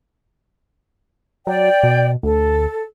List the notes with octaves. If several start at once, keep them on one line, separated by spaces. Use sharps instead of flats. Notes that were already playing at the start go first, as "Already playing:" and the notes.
F#3 D5 G5
B2
D2 A4